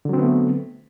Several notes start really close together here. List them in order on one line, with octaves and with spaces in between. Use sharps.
D3 F#3 C4 B3 A3